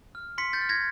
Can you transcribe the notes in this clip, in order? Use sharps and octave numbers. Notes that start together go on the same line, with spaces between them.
F6
C6 B6 C#7
G6 A6
F6
G#6 A#6